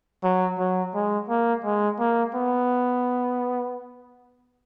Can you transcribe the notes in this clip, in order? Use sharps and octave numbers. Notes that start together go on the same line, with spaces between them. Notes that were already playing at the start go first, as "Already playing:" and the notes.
F#3
F#3
G#3
A#3
G#3
A#3
B3